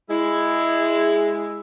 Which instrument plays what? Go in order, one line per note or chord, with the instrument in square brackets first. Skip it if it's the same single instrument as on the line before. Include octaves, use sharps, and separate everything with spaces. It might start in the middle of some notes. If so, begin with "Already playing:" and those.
[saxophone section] G#3 E4